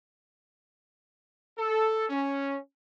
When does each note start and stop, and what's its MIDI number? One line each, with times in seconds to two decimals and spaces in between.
1.58 2.04 69
2.09 2.56 61